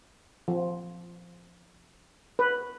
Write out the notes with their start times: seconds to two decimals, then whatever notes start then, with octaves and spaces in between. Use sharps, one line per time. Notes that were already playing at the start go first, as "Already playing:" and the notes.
0.48 F3
2.39 B4